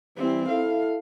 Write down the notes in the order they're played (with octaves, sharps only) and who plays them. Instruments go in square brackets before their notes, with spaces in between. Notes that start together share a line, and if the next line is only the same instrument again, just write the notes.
[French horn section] E3 G3 [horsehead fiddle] C4 E4
[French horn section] E4 A4 [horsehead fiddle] F5